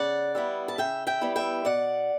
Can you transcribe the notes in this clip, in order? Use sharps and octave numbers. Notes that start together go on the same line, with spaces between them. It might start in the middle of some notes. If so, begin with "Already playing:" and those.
Already playing: C#3 D5 F#5
G3 B3 E4
A5
C#3 E5 G5
E5 G5
G3 B3 E4
E5 G5
B2 D5 F#5